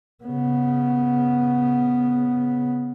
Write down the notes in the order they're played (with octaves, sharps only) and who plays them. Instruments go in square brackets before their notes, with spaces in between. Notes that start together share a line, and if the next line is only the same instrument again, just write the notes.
[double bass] C#3 B3